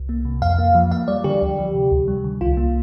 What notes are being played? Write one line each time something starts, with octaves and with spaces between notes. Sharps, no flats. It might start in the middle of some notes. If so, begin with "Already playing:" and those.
Already playing: C2
A#3
C3
F2 F5
A#3
F3
A#3 F5
G3 D5
D3 G4
D2
F3
C3
D2
G3
D3
C2 F4
A#3